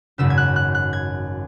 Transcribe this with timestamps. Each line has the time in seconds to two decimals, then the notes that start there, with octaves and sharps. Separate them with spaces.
0.18 G#1 F#2 C#3 E6
0.30 G#6
0.38 F#6
0.56 F#6
0.75 F#6
0.93 G#6